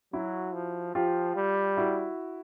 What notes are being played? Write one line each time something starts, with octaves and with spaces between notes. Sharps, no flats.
F#3 E4 F#4
F3
F3 F4 G4
G3
E4 F#4